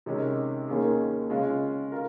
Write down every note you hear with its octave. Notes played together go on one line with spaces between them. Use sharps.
C3 D#3 G#3 C#4
D#2 D#3 A#3 C#4 G#4
C#3 G#3 C#4 F4
F4 A#4